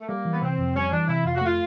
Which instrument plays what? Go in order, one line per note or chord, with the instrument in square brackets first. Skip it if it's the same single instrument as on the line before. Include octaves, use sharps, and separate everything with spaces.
[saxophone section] A3
[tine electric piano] G3 [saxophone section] A#3
[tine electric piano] E3
[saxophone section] B3
[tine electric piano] C3 [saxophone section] C4
[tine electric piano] F2
[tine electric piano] G3 [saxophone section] C#4
[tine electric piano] E3 [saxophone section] D4
[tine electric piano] C3 [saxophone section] E4
[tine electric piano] F2 [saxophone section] F4
[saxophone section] F#4
[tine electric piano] A3 [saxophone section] F4